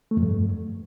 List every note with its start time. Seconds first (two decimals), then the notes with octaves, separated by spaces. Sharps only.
0.11 A3
0.17 F2
0.23 G2